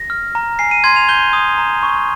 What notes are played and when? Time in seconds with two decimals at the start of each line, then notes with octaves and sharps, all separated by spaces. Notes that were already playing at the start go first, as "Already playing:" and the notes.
Already playing: A#6
0.10 F6
0.35 A#5
0.59 G#5 C7
0.71 D#7
0.84 C6 G#6
0.96 F7
1.09 G6 G7
1.33 D#6
1.58 A#5
1.83 C#6